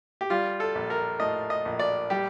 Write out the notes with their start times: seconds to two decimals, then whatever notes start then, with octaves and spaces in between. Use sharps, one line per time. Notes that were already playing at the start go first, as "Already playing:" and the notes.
0.21 G4
0.30 G3 F4
0.60 A4
0.75 A#1
0.90 A#4
1.20 A2 D#5
1.50 D#5
1.65 A#1
1.79 D5
2.10 G3 G4